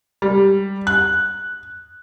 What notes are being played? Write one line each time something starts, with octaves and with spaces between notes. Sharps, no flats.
G3
F#6